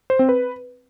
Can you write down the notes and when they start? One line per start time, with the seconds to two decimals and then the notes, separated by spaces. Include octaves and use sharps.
0.10 C5
0.19 C4
0.29 B4